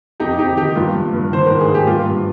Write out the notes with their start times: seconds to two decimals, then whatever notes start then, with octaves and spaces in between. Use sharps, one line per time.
0.20 F2 D#4 G4
0.38 F2 D#4 G4
0.57 D#3 D#4 G4
0.75 G2 F4
0.94 G2
1.13 G2
1.32 D#3 C5
1.47 G#2 A#4
1.60 G#4
1.68 G#2
1.74 G4
1.87 G2 F4
2.06 G2